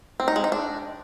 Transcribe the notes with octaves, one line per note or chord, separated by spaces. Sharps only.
C4
D#4
G#3
D#4
D4